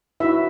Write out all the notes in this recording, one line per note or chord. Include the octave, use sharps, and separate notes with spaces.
D#4 E4 F#4 B4 E5